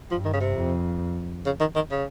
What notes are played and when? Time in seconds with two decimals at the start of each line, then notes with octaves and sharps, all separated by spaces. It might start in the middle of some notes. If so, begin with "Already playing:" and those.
0.11 G2 F3
0.25 D#3
0.33 C#3
0.40 C3
0.55 F2
1.46 C#3
1.60 D#3
1.76 D#3
1.91 C#3